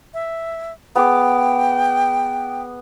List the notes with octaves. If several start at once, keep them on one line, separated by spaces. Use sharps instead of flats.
E5
B3 G#4 G5 D6